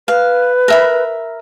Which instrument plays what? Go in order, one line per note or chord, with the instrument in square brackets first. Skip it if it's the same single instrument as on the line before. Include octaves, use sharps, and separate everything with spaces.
[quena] B4 [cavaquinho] F5
[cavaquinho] A#4 E5 B5